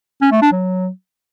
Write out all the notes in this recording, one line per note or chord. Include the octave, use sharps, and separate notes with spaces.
C#4
A3
D4
F#3